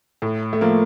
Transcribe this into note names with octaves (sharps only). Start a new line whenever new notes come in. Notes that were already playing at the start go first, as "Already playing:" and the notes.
A2
A3
F3 A#3